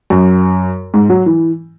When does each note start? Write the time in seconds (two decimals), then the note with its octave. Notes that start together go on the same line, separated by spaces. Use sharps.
0.10 F#2
0.94 G#2
1.10 F#3
1.26 E3